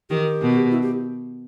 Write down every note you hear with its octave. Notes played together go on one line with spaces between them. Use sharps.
D#3 G4
B2
E4
G4